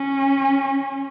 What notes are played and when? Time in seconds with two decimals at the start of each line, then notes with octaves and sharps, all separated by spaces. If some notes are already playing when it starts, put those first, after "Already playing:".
Already playing: C#4